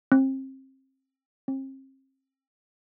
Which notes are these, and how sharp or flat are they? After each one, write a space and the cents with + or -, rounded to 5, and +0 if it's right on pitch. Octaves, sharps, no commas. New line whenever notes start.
C4 +30
C4 +40